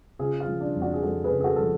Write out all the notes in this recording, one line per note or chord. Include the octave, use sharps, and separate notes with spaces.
C#3 F4 G#4
F4
F3
D4
F2
D4 F#4
G#4
F2 F#4 A4
G#4 B4
C#3
G#4
F#4 A4
F3 A4